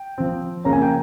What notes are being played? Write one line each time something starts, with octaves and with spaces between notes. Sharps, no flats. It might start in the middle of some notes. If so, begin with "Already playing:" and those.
Already playing: G5
F3 C4
C#3 F3 A#3 C#4 A#5
G#5
G5